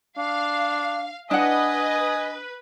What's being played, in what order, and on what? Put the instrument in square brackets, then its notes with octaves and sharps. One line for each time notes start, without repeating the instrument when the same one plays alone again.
[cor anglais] D4 [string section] F5
[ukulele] D4 F#5 [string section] B4 [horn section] D#5 [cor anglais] G#5